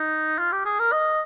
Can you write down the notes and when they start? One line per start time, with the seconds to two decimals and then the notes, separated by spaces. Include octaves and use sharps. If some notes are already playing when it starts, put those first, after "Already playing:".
Already playing: D#4
0.39 F4
0.52 G4
0.65 G#4
0.79 A#4
0.92 D#5